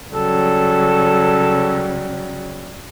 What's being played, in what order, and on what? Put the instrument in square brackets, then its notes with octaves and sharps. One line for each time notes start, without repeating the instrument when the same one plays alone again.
[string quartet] C#3 F#3 G3 [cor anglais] A4